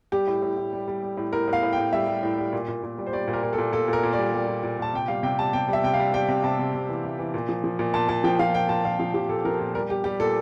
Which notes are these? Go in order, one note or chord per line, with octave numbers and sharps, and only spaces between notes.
G3 G4
A2
A2
A2
G3
G3
G3
A2
A2 A#4
A2
F5
A2
G5
A2
G3 E5
G3
A2
G3
A#2
A#2
A#2
G3
C5
G3 D5
A#2
A#4
A#2
A4
A#2
A#2 A4
A#2 A#4
A#2
D5
G3
G3
A#2
A#2
A#2 A5
C3 G5
G3 F5
C3 G5
G3 A5
C3 G5
G3 E5
C3 G5
F5
G3
G3 G5
C3
C3 A5
C3
C3
E3
C3
E3
A#2
F3
F3
A#2
A#2 A5
A#2 A5
F3 G5
F3 F5
A#2 G5
A#2 A5
A#2 F5
F3 F5
F3 G4
A#2 A4
F3 A#4
A#2
G3 A#4
G3 G4
G3 G4
A#2 A4